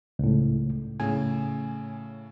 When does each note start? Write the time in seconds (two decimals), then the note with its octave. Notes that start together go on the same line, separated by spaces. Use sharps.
0.19 C#2 A2
1.00 A2 C#3 G#5